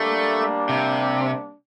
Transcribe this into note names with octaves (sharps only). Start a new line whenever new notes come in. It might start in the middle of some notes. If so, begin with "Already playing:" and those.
Already playing: G3 A3 A#3 D4
C3